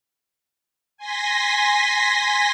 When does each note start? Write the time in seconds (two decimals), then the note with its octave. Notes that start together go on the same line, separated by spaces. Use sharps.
0.97 G#5 C6 A#6 B6